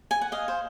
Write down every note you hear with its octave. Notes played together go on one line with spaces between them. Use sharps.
G#5
F#5
D#5 F5
C5